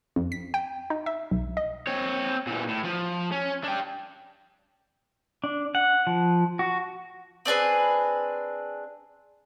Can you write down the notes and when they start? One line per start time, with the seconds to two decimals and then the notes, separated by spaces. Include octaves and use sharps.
0.16 F2
0.32 B6
0.54 G5
0.90 D#4
1.06 E5
1.31 B1
1.57 D#5
1.87 C4 C#5
2.47 A#2 E3
2.68 A2
2.84 F3
3.32 C#4
3.64 D4 G5
5.44 D4
5.75 F#5
6.07 F3
6.59 F#4
7.45 C4 D4 G#4 B4